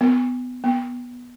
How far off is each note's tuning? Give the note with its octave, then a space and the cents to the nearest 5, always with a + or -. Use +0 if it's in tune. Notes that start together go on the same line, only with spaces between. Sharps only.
B3 +20
B3 -10